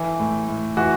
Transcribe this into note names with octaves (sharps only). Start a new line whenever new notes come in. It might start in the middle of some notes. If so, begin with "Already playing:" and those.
Already playing: E3 A4
A2
A2
E3 F#4